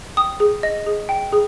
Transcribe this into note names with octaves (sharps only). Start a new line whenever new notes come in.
G5 D#6
G#4
D#5
G#4
G5
G#4